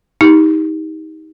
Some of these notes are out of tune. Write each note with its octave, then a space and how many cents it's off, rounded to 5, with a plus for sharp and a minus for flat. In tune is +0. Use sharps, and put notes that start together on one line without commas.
D#4 +25 G4 +20